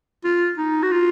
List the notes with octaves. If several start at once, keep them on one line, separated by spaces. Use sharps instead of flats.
F4
D#4
F#4
F4